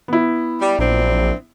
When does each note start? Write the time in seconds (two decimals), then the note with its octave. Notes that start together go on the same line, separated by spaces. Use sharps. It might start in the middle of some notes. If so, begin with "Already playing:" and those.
0.08 B3 E4
0.61 G3
0.79 A#1 F#3 C4 D4